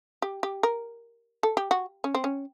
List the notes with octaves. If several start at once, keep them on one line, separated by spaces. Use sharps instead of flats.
G4
G4
A#4
A4
G4
F#4
C#4
C4
C#4